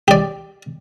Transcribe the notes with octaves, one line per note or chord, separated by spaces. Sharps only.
G4 D5